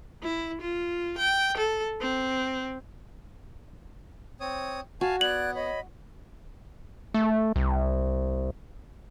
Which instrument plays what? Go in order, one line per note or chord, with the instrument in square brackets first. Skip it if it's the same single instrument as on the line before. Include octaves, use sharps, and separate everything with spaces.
[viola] E4
F4
G5
A4
C4
[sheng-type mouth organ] C4 C#5 D#6
[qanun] F#4 [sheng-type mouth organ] F5 G#5 A5
[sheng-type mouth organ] B3 [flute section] D5 F#6 G#6 [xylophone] F#7
[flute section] C#5 D#5 B5
[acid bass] A3
C2